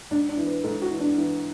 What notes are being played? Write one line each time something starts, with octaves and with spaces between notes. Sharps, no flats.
G#2 D4
D4
E3
B4
G#2 A4
F#4
E3
D4
E3